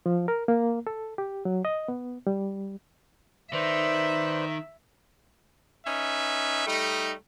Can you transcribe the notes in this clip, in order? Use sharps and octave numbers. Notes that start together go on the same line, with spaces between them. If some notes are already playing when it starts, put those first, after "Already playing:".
F3
A#4
A#3
A4
G4
F#3
D#5
B3
G3
D#3 B4 C5 D5 E5
C#4 D#4 B4 E5
G3 A3 D#4